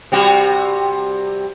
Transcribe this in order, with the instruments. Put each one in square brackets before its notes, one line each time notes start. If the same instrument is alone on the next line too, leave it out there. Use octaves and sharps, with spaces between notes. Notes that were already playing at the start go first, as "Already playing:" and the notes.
[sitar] C3 G3 F#4